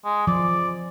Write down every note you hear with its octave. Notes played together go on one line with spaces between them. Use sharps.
G#3
F3 D5